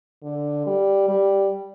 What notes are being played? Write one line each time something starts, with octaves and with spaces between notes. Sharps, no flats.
D3
G3
G3